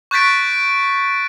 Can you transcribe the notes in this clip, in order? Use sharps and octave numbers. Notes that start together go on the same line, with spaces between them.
C#6 F#6 G6 A6 B6 D7